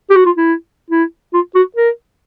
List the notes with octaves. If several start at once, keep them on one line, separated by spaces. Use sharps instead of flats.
G4
F#4
F4
E4
E4
F4
F#4
A#4